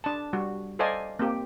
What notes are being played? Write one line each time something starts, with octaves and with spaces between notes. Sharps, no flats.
D4 A5
G3 F#4
A4 C5 D5 D#5 F5 G#5
A#3 C4 G4